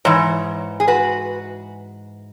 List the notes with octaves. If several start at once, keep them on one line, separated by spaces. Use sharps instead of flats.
G#2 E3 C#5
G#4
F#4 B4